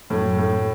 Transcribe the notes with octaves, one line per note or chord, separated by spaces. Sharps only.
F#2 A2
A2